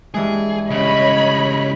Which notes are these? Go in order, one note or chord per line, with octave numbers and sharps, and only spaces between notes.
G2 E3 G#3 G#4
C#3 G3 C#5 D#5 B5